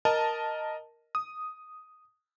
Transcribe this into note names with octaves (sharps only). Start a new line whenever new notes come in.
A#4 D#5 A5
D#6